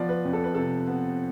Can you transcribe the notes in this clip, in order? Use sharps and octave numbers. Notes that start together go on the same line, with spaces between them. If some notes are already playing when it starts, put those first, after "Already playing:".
Already playing: F3 B3 D5
B4
F2
A4
B4
C3 A4
B3